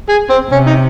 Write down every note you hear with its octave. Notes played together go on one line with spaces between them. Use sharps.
G#4
C4
C3 C#4
D#4